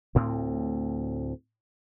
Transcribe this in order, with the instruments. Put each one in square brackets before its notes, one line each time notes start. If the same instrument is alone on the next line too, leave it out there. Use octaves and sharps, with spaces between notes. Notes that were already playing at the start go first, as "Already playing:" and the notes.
[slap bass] D2 A2 C4